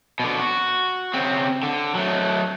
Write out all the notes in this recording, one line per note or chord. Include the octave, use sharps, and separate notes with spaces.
B2 D3
F#4
C#3 C4
D3
F#3 A3